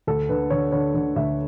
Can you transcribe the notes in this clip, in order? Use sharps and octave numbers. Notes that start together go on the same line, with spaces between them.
D2 A4
D3 B4
D3 C#5
D3 C#5
D3
D2 E5